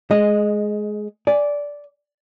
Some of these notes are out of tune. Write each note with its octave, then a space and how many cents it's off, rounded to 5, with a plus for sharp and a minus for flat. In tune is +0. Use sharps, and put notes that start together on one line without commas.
G#3 +15 D#5 -5
D5 -10 G#5 -5